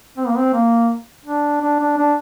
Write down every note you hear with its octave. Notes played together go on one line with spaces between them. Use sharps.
C4
A#3
C4
A#3
D4
D4
D4
D4